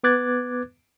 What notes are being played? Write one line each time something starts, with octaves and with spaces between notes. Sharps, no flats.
B3 B4 D6 F#6 G#6 A6